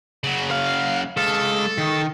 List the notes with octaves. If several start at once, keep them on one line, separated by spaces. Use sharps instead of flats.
C#3 F#3
F5
G#3 A4 F5
D#3